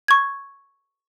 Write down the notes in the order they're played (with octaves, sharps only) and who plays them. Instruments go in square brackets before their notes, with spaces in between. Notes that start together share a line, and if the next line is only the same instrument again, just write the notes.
[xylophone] C#6 G#6